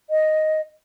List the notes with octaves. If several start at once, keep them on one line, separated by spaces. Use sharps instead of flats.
D#5